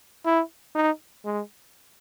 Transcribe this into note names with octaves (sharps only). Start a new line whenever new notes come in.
E4
D#4
G#3